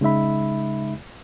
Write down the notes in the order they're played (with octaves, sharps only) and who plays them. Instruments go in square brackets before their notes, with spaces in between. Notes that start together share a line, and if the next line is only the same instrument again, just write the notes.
[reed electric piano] C#3 G#3 D#4 E5 B5